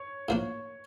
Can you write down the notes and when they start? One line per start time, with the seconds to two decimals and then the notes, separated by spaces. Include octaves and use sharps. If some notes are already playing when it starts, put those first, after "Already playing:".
Already playing: C#5
0.29 A2 F3 A#3 D4